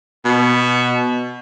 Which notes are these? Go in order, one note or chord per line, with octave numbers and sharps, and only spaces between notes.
B2